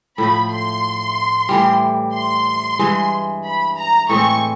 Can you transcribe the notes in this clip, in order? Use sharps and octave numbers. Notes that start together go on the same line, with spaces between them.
A2 F3 A3 B5
C6
A2 E3 G3
C6
G2 E3 G#3
B5
A#5
A2 E3 G#3 C4 C#6